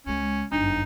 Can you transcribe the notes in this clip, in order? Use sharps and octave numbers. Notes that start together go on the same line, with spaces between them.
C#2 G#3 C#4
G1 F#2 D4 D#4